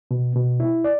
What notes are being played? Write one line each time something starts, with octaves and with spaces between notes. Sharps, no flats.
B2
B2
E4
D5